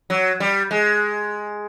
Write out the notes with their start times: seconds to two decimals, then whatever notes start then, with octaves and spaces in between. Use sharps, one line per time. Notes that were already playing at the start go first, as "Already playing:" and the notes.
0.10 F#3
0.40 G3
0.71 G#3